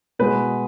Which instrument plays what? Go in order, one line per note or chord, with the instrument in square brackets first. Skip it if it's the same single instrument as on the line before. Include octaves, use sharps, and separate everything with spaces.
[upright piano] B2 G#3 B4